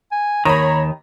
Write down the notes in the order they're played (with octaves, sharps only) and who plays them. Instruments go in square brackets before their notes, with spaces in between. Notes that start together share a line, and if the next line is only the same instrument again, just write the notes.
[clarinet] G#5
[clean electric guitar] D#2 D#3 [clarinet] C#5 [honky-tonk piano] A#5 B5